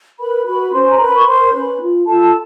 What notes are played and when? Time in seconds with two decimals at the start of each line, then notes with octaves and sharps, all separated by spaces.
0.19 A#4 B4 B5
0.46 F#4 B4 B5
0.73 C#4 C5 C6
0.91 A#5
1.00 A#4 B4 B5
1.15 C#6
1.27 A#4 C5 C6
1.53 C#4 B4 B5
1.81 F4
2.07 F4 A4 A5